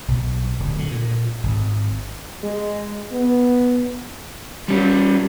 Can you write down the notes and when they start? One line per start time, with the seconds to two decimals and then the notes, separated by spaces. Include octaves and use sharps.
0.08 B1
0.59 D1
0.79 D3
0.91 A#2
1.43 G#1
2.43 G#3
3.12 B3
4.68 G3 C#4